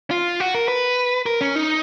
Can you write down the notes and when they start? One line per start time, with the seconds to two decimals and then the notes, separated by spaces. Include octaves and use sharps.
0.11 F4
0.40 F#4
0.55 A#4
0.68 B4
1.26 A#4
1.41 C#4
1.56 D#4